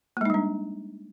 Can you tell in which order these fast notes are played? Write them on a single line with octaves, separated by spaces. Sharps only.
A#3 G#3 D#4 G3 D4